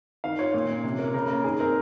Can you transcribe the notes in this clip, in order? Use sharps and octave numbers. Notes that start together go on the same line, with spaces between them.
D#3 F5
F4 C#5
A#2
C#4
C3
A#3
C#3 A#4
A#3
D#3 G#4
C4 A#4